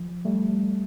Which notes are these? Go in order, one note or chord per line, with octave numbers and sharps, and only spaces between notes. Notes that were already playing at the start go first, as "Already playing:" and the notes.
Already playing: F3
G3 A3